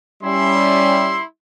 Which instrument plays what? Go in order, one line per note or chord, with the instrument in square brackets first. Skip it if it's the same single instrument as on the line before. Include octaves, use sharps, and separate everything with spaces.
[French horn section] G3 C#4 [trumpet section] E4 E5 C6